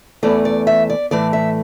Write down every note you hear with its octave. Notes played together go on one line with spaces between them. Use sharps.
E2 E3 A3 D5
D5
E5
D5
A2 E3 A3 D5
E5